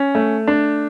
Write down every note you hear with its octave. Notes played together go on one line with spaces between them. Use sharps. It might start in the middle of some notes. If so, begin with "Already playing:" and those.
Already playing: C#4
A3
D4